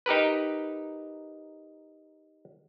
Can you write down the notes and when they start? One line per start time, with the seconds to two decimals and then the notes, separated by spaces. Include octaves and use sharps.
0.06 D#4 G4 A#4 B4